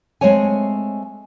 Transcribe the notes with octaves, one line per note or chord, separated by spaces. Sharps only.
G#3 A3 C4 C#5 G#5